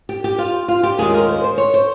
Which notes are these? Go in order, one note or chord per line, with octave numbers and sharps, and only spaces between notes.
G4
G4
F4
F4
G4
D#2 D#3 G#3 C#4 F4 G#4
A#4
C5
C5
C#5
C5